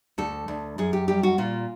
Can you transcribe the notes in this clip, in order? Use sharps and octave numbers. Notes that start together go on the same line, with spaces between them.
D2 A4
D2
F#2 G#4
G4
G3 G4
F#4
A#2 F4